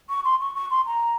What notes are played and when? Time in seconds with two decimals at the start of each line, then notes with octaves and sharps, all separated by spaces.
0.10 C#6
0.25 C6
0.41 C#6
0.55 C#6
0.71 C6
0.86 A#5